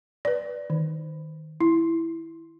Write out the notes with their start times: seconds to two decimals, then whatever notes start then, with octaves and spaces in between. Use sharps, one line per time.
0.25 B4 D5
0.70 D#3
1.61 E4